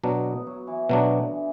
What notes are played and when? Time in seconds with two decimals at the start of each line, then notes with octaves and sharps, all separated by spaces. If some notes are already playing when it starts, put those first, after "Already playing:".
0.04 B2 F#3 B3 D4
0.25 B3
0.47 F#3
0.67 E3
0.89 B2 D3 F#3 D4
1.31 E3